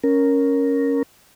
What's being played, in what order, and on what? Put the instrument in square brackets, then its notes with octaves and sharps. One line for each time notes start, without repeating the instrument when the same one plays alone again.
[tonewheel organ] C#4 A#4